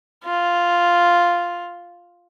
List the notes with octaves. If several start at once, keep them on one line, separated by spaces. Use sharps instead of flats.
F4